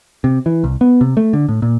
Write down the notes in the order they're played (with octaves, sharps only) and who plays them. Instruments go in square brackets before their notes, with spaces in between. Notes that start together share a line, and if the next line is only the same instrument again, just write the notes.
[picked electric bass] C3
E3
C2
B3
C3
A3
D3
A2
A#2